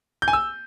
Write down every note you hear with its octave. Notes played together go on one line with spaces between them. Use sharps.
G6
G#5
E6